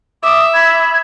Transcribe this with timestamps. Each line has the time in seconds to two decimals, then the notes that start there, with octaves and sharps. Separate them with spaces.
0.23 E5 D6 D#6
0.54 B5 G#6